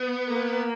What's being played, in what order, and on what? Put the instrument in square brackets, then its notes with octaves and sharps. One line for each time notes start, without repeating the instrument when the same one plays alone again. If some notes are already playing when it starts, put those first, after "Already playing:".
Already playing: [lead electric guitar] B3
[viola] A#3